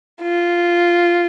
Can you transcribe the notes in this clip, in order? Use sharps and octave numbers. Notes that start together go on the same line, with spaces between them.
F4